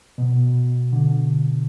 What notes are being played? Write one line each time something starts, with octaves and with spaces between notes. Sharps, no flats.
B2
D3